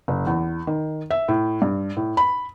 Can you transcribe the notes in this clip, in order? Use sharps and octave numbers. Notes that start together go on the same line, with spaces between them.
F#1
E2
D#3
E5
A2
G2
A2
B5